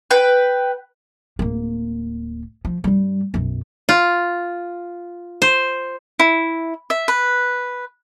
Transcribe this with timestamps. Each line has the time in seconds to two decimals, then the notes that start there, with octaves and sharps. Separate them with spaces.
0.11 B4 G5
1.39 D1 A#3
2.65 F3
2.84 G2 G3
3.34 B1 F#2
3.89 F4
5.42 C5
6.19 E4
6.90 E5
7.08 B4